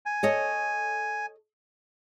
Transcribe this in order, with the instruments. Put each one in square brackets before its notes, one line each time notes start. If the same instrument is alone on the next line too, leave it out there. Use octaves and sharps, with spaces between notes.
[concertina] G#5
[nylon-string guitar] A4 C#5 D#5